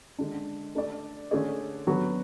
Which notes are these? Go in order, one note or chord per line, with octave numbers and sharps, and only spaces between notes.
D3 G#3 D4
A3 D4 A4 D5
D3 A3 C#4 G#4 D5
D3 F#3 B3 F#4 B4